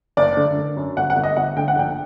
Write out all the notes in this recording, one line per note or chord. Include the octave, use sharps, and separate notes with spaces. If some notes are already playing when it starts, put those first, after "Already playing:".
F#1 D5
D3
D3
F#2
G1 F#5
F#5
G1
D#5
G1 F#5
D3 G5
F#5
A#1 G5